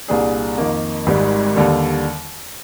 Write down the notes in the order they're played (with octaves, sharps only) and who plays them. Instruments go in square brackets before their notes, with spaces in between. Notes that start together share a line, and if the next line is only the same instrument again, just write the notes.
[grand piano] C2 A#2 G3 D4 G#4
F2 D#3 A#3
G#1 G#2 G3
D#2 D3 G3